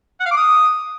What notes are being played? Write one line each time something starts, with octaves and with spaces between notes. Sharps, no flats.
F#5
F5
D6
D#6